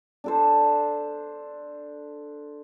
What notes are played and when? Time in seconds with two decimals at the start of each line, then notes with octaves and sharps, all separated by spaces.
0.24 D4 A4 C5